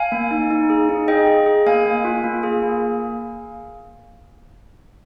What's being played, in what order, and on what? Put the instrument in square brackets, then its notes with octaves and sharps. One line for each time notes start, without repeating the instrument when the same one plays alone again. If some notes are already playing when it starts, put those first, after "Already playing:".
Already playing: [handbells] F5 G#5
A#3
D#4
D#4
G#4
D#4
G#4 D#5 G5
G#4
G#4
A#3 F5 G#5
A#3
F4
A#3
G#4
A#3